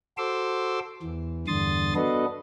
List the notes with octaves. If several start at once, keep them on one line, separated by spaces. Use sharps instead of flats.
F#4 A4 C5 C6 D6 E6
E2 E3
E2 G2 D3 C6 D#6 A6
B3 D4 F#4 A4 B4 D#5